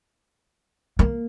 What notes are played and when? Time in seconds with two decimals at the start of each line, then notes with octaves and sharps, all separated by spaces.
0.99 A#3